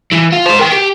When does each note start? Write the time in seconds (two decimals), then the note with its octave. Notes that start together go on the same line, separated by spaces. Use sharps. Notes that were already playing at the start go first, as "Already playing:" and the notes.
0.13 E3
0.33 F4
0.46 G#3 C5
0.59 A#4 G5
0.72 G4